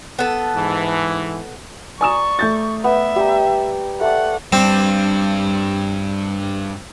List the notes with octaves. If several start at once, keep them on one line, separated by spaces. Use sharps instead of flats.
B3 A4
G#2 E3
D5 G#5 A#5 C#6 D#6 E7
A3 G6 A6
B3 E5
G3 G5 A#5
A3 D5 F#5
G2 G3 C4 D4